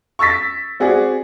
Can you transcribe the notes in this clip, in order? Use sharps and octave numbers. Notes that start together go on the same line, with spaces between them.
C#6 E6 A6 B6
C4 F#4 G#4 D5